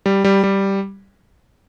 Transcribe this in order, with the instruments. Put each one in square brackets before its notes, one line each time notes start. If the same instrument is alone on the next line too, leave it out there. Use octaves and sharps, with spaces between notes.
[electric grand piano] G3
G3
G3